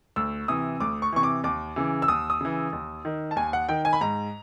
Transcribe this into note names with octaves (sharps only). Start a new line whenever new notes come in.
D2 E6
C3 E3 D#6
D2 D6
C#6
C3 E3 C#6
D6
D#2 D6
C#3 E3
E6
D#2 D#6
D#6
C#3 E3
D#2
D#3
A5
D#2 G#5
F#5
D#3 G5
G#5
B5
G#2 A#5